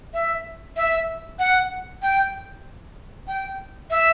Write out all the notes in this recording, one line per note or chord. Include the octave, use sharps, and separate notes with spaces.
E5
E5
F#5
G5
G5
E5